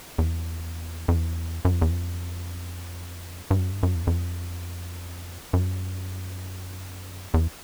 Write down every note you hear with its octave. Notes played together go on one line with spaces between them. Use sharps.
E2
F2
E2
F#2
F2
E2
F2
G2
F#2
G2
F#2
E2
F#2
F2
F#2
E2